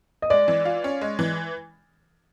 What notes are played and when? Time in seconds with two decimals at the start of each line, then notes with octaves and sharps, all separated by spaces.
0.22 D#5
0.30 G#3 D5
0.48 E3
0.65 F4
0.84 C#4
1.01 G#3
1.19 E3